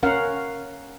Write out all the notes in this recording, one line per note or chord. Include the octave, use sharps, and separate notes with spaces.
C#4 A#4 F5 F#5